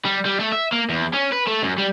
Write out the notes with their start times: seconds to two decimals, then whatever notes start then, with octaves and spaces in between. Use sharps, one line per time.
0.05 G3
0.25 G3
0.40 A3
0.52 E5
0.72 A#3
0.90 E2
1.14 C#4
1.33 B4
1.48 A3
1.63 F#2
1.78 G3